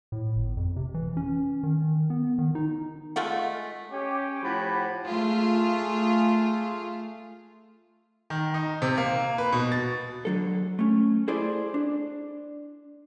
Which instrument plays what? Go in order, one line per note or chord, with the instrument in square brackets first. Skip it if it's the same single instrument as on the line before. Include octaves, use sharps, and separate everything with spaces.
[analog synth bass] A2
G1
F2
C3
E3
C#4
D#3
B3
D#3
D#4
[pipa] G#3 A3 F4 F#5
[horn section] C#4 G4
A2 F3 G4 F#5 B5
[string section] A3 F4 G#4
[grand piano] D#3
D#4
C3
A#3
B4
B2
A6
[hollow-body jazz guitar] D3 F#3 A4
A3 C#4
E4 G#4 A4 C5 D5 G#5
D4